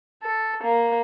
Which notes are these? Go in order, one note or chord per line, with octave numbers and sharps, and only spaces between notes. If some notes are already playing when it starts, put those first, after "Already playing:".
A4
A#3